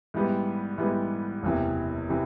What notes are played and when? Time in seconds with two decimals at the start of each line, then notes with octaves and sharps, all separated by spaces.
0.14 G#2 E3 G3 B3
0.78 G#2 E3 G3 B3
1.43 F#1 E2 C3 E3
2.09 C3 E3